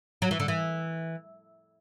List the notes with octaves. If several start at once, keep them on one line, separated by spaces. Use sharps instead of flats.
F#3
E3
D3
E3